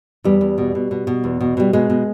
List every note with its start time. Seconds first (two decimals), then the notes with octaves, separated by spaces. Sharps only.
0.24 E2 G3
0.41 E2
0.58 B2
0.75 B2
0.91 B2
1.07 B2
1.24 E2
1.41 B2
1.57 B2 G3
1.73 B2 G#3
1.90 B2